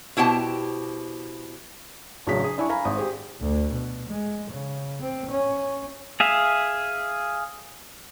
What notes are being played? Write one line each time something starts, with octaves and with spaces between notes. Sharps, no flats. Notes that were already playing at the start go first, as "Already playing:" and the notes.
B2 E4 G4 C5 A5
A1 C#3 F#3 D4 G#4 B6
G#4
D4 E4 E5 G#5 C#6
F5 G#5 A#5 B5
G#1 D#6
G4 G#4 C5
D2
B2
G#3
C#3
C4
C#4
G#4 E5 F5